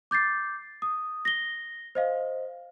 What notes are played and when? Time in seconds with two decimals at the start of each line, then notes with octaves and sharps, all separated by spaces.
0.11 D6 G6 A6 C7
0.82 D#6
1.25 A#6 G7
1.95 C5 D#5 F5